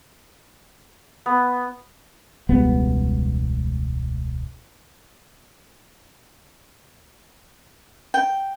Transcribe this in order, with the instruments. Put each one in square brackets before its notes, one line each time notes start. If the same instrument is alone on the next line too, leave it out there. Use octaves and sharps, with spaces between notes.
[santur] B3
[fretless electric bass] E1 C#2 G3 B3
[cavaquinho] G5